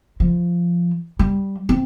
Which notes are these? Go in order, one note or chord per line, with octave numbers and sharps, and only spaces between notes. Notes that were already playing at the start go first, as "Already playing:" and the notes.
F3
G3
C4